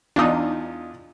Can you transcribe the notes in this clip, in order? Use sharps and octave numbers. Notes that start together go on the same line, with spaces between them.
E2 D4 D#4 F4 D#6